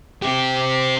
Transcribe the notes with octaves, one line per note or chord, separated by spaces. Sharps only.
C4 G4